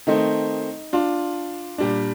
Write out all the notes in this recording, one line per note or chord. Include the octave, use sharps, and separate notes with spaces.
D#3 A3 C4 D#4
D4 F4
A#2 G3 D4